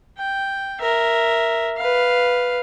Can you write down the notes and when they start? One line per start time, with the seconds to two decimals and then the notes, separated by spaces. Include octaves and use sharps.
0.18 G5
0.81 A#4 E5
1.77 B4 F5